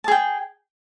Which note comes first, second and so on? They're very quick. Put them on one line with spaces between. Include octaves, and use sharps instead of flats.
A5 G#4 G5